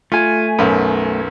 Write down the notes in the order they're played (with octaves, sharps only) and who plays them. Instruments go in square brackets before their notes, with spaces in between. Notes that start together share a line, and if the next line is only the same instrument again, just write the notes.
[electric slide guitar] A3 G#5 [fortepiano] F4
[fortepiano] B1 F#2